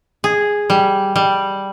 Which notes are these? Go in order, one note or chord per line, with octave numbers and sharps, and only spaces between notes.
G#4
G3
G3